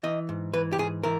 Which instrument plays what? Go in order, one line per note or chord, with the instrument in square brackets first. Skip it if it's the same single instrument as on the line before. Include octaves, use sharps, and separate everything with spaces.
[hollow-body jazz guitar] E3 D#5
G#2
E3 B4
G4
G#2 G#4
E3 A#4